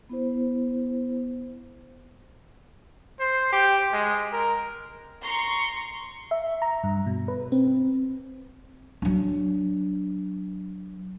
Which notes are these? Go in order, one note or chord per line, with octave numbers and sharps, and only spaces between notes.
B3 E4 C5
C5
G4
G#3
A#4
A#5 C6 C#6 C#7
E5
A#5
G2
B2
B4
C4
F#3 D4